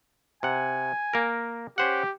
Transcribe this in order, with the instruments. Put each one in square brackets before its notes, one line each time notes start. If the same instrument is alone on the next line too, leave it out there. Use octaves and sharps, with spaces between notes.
[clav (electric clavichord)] C3 F#5 [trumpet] G#5
[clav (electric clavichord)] A#3 A#4
[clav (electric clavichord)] C#4 C5 F#5 [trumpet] G4